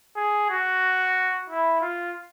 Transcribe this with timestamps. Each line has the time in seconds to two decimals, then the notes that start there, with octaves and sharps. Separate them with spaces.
0.16 G#4
0.50 F#4
1.50 E4
1.81 F4